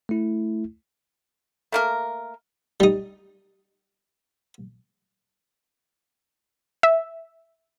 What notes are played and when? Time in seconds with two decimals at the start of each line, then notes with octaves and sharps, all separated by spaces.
0.09 A3 E4
1.72 A3 A#3 A#4
2.80 G3 D#4
6.83 E5